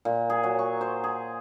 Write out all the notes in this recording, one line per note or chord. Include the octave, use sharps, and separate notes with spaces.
A#2
G#4
F#3
C#6
C5
G#4